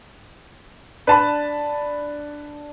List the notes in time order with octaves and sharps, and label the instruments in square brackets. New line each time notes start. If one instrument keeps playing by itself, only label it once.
[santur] D4 [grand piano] B4 A5 B5